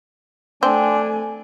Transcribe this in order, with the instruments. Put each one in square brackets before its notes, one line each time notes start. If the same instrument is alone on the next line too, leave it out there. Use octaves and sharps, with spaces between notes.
[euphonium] A3 [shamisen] C4 [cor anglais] D4 [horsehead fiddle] G#5